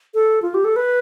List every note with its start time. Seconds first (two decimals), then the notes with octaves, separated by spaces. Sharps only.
0.14 A4
0.42 F4
0.54 G4
0.64 A4
0.76 B4